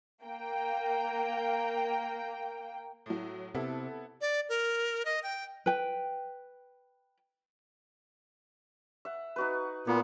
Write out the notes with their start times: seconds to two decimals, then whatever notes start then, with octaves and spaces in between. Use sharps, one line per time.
0.22 A#3 G5
3.06 A2 F#3
3.55 C3 B3 E4 A4
4.21 D5
4.49 A#4
5.05 D#5
5.23 G5
5.66 B4 G5
9.05 E5 F#5
9.36 D#4 F#4 B4
9.87 A#2 A#3 B3